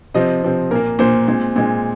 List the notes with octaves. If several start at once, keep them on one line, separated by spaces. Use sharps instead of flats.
C3 F3 C4 D#5
C3 F3 C4
A#2 A#3 A#4
A#2 A#3 C5
A#2 G#3 C4
A#2 G#3 C4